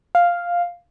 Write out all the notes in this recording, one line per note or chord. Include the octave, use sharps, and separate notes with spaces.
F5